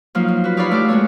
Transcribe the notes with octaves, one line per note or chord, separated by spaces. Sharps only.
F3 F#3 A#3 D#4 F4
A#3
F#4 B4
D#4 G4 C#5 D5 F5 B5
A3 E4 F#4 G4 D6 F6
G#3 A#3 B3 C#5